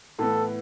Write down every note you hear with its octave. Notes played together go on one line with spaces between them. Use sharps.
A2 E3 B3 A4